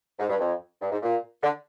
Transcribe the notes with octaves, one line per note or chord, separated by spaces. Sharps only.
G#2
G2
F2
G2
G#2
A#2
D3